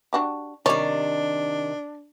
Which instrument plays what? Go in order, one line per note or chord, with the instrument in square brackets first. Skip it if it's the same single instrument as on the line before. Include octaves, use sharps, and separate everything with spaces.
[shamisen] D4 F#4 G4
[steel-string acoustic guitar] C3 D#3 [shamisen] G3 C#5 [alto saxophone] D4 [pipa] D5